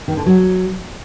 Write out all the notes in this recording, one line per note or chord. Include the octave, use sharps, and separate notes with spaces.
D#3
D3
F#3